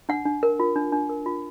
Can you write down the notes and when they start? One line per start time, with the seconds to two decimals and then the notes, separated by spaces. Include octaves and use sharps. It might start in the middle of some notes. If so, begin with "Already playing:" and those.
0.09 D4 F#5
0.25 D4
0.43 A#4
0.60 F4
0.76 D4
0.92 D4
1.09 A#4
1.26 F4